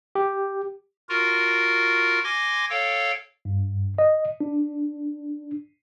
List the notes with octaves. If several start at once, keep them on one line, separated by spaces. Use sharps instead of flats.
G4
F4 F#4 A#4
G#5 C6 D6 G#6 A#6
A4 C#5 F5 G5
G2
D#5
D4